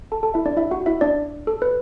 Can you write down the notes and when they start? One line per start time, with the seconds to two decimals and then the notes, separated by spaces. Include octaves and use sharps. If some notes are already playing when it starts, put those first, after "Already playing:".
0.12 A4 A5
0.23 A4 A5
0.34 E4 E5
0.46 D4 D5
0.57 E4 E5
0.71 F#4 F#5
0.86 E4 E5
1.01 D4 D5
1.47 A4
1.62 B4